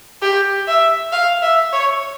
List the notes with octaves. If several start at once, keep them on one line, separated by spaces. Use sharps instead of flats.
G4
E5
F5
E5
C#5